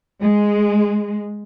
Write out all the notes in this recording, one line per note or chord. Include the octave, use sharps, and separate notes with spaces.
G#3